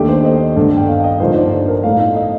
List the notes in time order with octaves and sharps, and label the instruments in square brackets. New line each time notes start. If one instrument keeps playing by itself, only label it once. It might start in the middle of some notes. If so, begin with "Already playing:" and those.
Already playing: [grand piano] D#2 D#3 A3 D4 G4
C5
D#5
G2 D3 A3 D4
G5
F5
D#5
G2 D3 F3 A#3 D#4 C5
D5
C5
A#4
A2 A3 D#4 F5
D#5